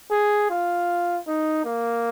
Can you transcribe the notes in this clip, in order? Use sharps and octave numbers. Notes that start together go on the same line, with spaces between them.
G#4
F4
D#4
A#3